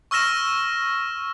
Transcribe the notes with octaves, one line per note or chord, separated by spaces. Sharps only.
C#6 E6 F6 A#6 E7